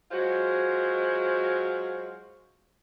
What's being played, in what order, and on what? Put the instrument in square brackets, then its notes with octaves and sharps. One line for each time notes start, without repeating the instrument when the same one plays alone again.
[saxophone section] F#3 G#3 F4 F#4 C5